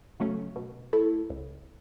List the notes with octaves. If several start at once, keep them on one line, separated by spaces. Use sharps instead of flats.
C#3 F#3 A3 C#4
B2
A3 E4 A4
C#2